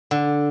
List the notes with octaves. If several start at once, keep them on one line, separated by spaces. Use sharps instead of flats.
D3